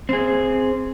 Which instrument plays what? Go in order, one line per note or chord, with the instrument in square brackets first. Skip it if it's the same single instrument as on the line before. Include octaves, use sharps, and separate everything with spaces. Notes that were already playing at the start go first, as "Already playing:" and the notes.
[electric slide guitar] C4 G#4